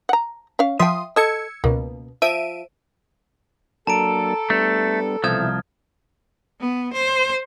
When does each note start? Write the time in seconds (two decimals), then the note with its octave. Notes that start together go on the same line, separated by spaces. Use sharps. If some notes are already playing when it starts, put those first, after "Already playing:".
0.09 F#5 A#5
0.59 C#4 F5
0.79 F3 E5 G5 C6 D#6
1.16 A4 D#5 E6 G#6 C#7
1.64 C#2 B2 A#3
2.22 F3 E5 D7 D#7
3.87 F#3 A#3 D4 A4 A5 A#5 D7
4.50 G3 A3 B3 D4
5.24 C2 B2 E3 F3 E5 D#6 F6 G#6
6.60 B3
6.93 C5